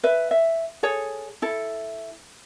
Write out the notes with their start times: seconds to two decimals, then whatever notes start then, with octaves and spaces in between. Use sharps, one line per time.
0.03 B4 E5
0.31 E5
0.83 G#4 A4 C#5
1.42 E4 A4